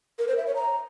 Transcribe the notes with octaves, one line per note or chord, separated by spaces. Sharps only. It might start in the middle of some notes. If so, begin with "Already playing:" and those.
A#4
C5
E5
C#5
A#5